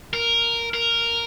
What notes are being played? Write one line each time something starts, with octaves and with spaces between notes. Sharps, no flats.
A#4
A#4